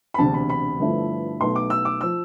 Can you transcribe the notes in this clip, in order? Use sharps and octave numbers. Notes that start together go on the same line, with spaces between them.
B5
E1 D2 C3 A5
B5
B5
G1 G2 F3 A3 E4
B1 B2 A3 C6
D6
E6
D6
F3 E6